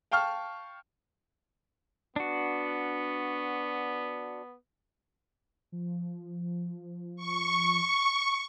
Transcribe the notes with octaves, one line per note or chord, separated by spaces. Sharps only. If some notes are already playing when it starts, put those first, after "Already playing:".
F5 G5 A5 C#6 F6
B3 D4 F#4
F3
C#6